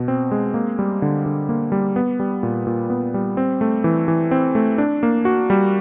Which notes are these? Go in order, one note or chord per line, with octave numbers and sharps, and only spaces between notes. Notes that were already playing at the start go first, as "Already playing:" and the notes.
Already playing: B2
C4
G#3
A#3
G3
D3
D3
A#3
G3
B3
G3
A#2
A#2
B3
G3
C4
A3
E3
E3
C4
A3
D4
A#3
F#4
G3